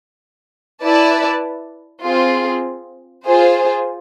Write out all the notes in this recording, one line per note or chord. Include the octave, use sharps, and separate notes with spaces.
E4 B4 D5 A5
C4 F4 G#4
F4 G#4 C5